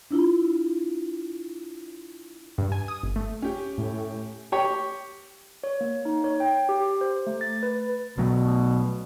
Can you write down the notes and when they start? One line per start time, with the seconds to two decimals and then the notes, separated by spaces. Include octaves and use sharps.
0.11 D4 E4 F4
2.58 G2
2.72 G#5
2.88 D#6
3.03 G1
3.16 A3
3.42 C#4 G4
3.78 A2
4.52 G4 C#5
5.64 C#5
5.81 A#3
6.05 D#4
6.24 C#5
6.40 G5
6.69 G4
7.01 C5
7.27 A3
7.41 A6
7.63 B4
8.18 B1 B2 F#3 A3